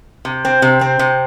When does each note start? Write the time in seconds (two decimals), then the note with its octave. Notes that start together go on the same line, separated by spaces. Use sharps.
0.25 C3
0.45 C4
0.62 C3
0.81 C4
0.99 C3